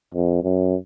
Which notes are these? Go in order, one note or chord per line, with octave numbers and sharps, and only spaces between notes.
F2
F#2